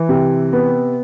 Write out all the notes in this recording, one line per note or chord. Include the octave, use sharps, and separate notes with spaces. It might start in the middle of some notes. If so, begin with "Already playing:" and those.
Already playing: E3
C3
B3